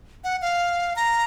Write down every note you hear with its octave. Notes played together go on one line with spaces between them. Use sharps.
F#5
F5
A#5